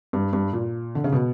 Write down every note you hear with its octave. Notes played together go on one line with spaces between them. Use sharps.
G2
G2
A#2
D3
C#3
B2